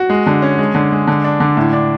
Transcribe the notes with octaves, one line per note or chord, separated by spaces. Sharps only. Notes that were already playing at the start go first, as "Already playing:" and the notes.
Already playing: F#4
G#3
D3
C#4
G#3
D3
G#3
D3
D4
D3
A2
D4